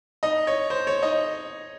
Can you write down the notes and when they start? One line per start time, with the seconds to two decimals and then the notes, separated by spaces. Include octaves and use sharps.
0.23 D#4 D#5
0.47 C#5
0.70 C5
0.87 C#5
1.03 D#4 D#5